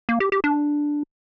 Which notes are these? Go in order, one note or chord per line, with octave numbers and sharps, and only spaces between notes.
A#3
G4
G4
D4